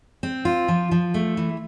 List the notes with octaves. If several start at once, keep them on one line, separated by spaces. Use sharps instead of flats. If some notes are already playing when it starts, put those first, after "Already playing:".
C4
F4
F3
F3
A3
E3